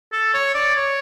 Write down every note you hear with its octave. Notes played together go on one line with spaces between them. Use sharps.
A4
C#5
D5
C#5